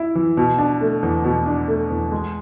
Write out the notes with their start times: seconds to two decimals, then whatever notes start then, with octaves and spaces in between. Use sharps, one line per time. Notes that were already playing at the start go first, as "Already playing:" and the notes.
Already playing: E4
0.15 E3
0.37 B2
0.58 D4
0.81 A3
1.03 E2
1.24 B2
1.46 D4
1.68 A3
1.90 E2
2.12 G#3